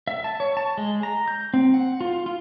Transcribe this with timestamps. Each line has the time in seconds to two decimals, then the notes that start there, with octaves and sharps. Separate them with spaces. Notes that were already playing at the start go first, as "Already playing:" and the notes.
0.07 E5
0.24 A5
0.40 C#5
0.57 A5
0.78 G#3
1.03 A#5
1.28 G6
1.54 C4
1.74 F#5
2.01 F4
2.26 F4